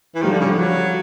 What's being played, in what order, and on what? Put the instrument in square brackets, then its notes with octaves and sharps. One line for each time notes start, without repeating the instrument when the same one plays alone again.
[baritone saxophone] E3
[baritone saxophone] D#3 [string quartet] F3 G3
[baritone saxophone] D3
C#3
D3
F#3